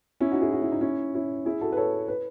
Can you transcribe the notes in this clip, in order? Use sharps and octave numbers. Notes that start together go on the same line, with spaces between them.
C#4 E4
D#4 F#4
E4 G#4
F#4
E4
D#4
C#4 E4
C#4 E4
E4 G#4
F#4 A4
B4
A4 C#5
B4